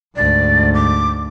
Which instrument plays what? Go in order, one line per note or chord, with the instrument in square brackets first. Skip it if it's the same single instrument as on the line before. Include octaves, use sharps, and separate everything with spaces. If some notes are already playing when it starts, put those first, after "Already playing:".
[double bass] D2 G#2 [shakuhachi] D5
[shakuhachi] D6